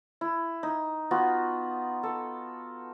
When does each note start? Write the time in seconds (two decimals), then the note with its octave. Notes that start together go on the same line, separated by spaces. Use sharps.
0.21 E4
0.63 D#4
1.11 B3 F4 F#4
2.03 A4